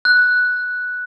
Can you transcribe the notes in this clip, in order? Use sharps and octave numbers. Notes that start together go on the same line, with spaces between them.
F#6